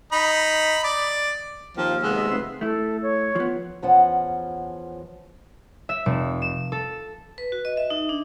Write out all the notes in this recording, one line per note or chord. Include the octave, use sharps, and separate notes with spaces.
D#4 B5
D5
D#2 F3 A#3 C4 A#4
C3 G#3 B3 E6
D#5 E5
F1 B4 E5 C6
A3 E4 A4
C#5
F3 B3
E2 F3 C#4 F#5
E5
F1
E7
A4
B4
F#4
D#5
E5
D#4
D4